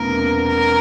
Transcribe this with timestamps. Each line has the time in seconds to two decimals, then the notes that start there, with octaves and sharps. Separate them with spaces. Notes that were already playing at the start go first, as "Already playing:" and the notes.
Already playing: E1 E2 C3 A#3 A#4
0.48 A#4